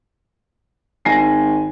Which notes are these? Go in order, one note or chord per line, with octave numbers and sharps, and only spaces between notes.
G#1 G#5 A#6 C7